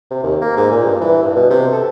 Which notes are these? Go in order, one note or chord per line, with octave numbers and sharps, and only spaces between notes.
C3
D#2
A#3
G#2
A#2
G2
E3
G2
B2
C3
A4